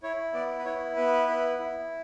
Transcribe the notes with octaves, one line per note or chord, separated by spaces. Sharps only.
E4 C#5
B3 D5
B4
E4 C#5
B3 B4
E4
E4